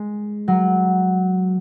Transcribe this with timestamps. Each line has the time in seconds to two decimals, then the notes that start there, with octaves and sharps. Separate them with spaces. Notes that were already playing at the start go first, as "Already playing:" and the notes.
Already playing: G#3
0.48 F#3